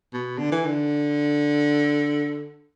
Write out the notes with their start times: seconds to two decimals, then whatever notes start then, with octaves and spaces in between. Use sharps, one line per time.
0.13 B2
0.38 D3
0.52 E3
0.66 D3